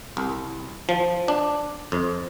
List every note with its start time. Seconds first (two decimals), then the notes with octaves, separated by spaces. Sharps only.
0.17 C2
0.89 F3
1.28 D4
1.92 F2